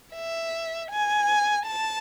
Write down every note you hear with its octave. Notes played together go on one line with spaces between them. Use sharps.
E5
G#5
A5